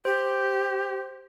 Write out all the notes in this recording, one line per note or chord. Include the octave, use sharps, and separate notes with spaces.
G4 C5